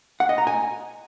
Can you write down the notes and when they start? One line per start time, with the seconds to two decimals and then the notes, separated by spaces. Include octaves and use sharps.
0.20 F#5
0.29 D#5
0.38 A#5
0.47 G#5